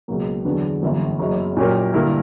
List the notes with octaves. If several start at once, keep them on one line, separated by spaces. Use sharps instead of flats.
C#2 B2 F#3 A#3
E2 D3 F#3 B3 D4
G1 F#2 E3 A#3
F#1 F#2 C#3 F#3
A#2 F#3 C#4 G4 A#4
G2 D3 A#3 E4 A#4